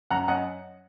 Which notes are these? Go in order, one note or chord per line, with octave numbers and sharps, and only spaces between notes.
F#2 F#5 A#5
F#2 D#5 F#5